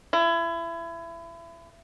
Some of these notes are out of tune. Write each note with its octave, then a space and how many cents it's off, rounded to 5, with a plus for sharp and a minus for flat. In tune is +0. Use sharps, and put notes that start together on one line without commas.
E4 +30